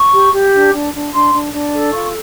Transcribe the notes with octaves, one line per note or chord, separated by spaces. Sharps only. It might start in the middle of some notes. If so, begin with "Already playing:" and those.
Already playing: C#6
G4
G4
D4
D4
D4
D4 C6
D4
D4
A4
F4 C#6